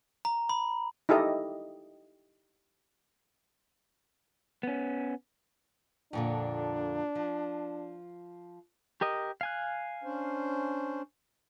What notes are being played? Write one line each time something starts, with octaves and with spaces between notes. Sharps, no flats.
A#5
B5
D#4 E4 G4 A4 D#5
B3 C#4
F2 A#2 D3 D4
F3
G4 A#4 D#5
F5 G#5 F#6
C#4 D4 C5